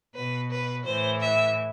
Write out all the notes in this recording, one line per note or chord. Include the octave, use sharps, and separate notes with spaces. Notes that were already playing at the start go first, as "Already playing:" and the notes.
B2 B4
B4
A2 E3 C5
E5